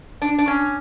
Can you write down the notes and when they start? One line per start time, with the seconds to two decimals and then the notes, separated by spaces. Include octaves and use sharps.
0.22 D4
0.38 D4
0.48 C#4